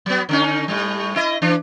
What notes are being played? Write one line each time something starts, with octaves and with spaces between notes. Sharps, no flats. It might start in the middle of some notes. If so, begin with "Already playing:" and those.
F#3 B3
D3 C#4 D#4
A2 G3
E4 D#5
E3 D4